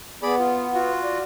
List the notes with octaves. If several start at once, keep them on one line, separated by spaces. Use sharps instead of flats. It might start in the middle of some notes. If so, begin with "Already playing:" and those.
B3 G#4 D5 B5
F4
F4 F#4
D5